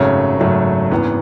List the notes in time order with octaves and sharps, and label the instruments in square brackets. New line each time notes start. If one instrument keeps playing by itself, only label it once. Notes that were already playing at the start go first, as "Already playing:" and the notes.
Already playing: [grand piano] G#1 F#2 C#3 F#3 A3 C#5
G#1 F#2 C#3 F#3 A3
G#1 F#2 E3 B3